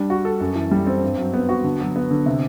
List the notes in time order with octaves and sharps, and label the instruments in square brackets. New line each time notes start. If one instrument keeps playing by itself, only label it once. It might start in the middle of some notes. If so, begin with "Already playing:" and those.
Already playing: [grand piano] G3 D4
F#4
A4
F#2
E3
G3
C4
G2
F#3
B3
F#4
D3
F#3
B3
D3
C3